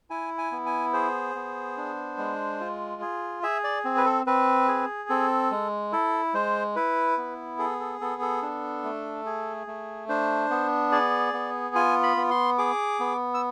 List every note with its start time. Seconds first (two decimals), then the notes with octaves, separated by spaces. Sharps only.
0.10 E4 G#5
0.38 G#5
0.52 B3
0.66 G#5
0.93 G#4 C5
1.35 B3
1.77 D4
2.18 G#3
2.60 F4
3.02 G#4
3.43 G#4 E5
3.64 D5
3.85 C4
3.97 B4
4.06 A4
4.26 C4 B4
4.68 G#4
5.09 C4 A4
5.51 G#3
5.92 E4 A4
6.34 G#3 C5
6.76 E4 B4
7.17 B3
7.59 G#4 A4
7.80 A4
8.01 B3 A4
8.22 A4
8.42 D4
8.84 A3
9.26 G#4
9.67 A3
10.09 D4 C5
10.51 B3
10.92 G#4 D5
11.33 B3
11.75 F4 G#5
12.03 B5
12.17 B3
12.31 C6
12.58 G#4 D6
13.00 B3
13.34 E6